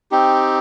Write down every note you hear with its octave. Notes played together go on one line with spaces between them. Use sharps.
C4 D#4 G4